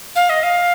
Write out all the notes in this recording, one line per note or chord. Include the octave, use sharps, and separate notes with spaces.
F5
D#5
F5